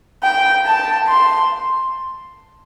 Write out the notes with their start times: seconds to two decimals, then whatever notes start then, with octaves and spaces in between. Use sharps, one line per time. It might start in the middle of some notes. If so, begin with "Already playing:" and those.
0.23 G5
0.66 A5
1.08 C6